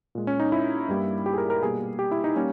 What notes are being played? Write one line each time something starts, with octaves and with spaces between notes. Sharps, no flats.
A#2 G#3
C#4
D#4
E4
G2 G3 A#3
G4
G#4
A#4
A#4
B2 G3 A#3 G#4
G4
E4
D#4
G3 A#3 C#4